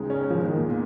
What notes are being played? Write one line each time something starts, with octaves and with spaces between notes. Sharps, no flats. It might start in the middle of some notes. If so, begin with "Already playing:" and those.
Already playing: C#2 C#3 G#3 D#4
C#4
F3
D#3
A#2
A#2